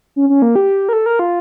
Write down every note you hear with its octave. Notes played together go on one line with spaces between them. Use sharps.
C#4
C#4
A#3
G4
A#4
A4
A#4
F4